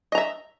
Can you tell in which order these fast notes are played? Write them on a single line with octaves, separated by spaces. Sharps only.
D#5 A#5 E5